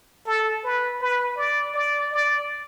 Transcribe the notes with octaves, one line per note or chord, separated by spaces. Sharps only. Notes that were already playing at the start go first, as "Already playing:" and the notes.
A4
B4
B4
D5
D5
D5